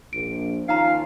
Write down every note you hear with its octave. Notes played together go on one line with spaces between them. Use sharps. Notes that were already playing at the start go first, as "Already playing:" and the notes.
A#1 D7
D#2 C#4 D#4 F4 F5 A#5